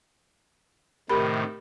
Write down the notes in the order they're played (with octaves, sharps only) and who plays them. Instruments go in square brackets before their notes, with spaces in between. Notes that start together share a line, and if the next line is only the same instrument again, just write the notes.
[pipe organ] A2 C3 D#3 [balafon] G4 A#4 B5